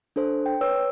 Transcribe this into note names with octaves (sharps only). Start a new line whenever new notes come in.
D4 A4 C5
G5
B4 C#5 E6